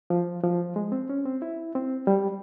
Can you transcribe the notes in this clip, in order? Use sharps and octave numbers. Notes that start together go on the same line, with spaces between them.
F3
F3
G#3
C4
C#4
C4
E4
C4
G3